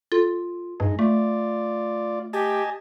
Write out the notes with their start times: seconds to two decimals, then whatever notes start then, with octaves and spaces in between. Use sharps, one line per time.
0.12 F4 A4
0.80 G2 G#3 D#4
0.99 A3 F4 D5
2.33 G4 D#5 G#5 A5